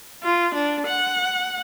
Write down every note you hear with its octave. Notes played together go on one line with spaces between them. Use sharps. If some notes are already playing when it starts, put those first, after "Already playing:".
F4
D4
F#5